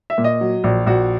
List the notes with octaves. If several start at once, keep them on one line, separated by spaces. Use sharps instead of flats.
E5
A#2
D#5
F#3
A#1
A#1 F#4